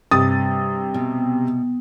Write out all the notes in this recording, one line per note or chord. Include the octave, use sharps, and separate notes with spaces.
G2 C3 D#6 A6
B2